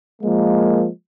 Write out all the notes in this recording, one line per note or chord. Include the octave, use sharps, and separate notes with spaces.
F3 G#3 A#3